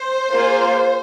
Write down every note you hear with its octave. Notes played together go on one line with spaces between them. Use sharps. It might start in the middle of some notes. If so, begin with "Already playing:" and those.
Already playing: C5
A#3 F4 G#4